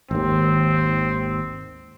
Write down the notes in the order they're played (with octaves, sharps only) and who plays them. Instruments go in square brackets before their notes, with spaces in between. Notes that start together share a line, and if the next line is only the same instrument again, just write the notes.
[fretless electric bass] G#1 D#2 [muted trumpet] C4